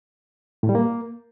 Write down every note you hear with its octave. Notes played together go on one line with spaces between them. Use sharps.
A2
G3
A#3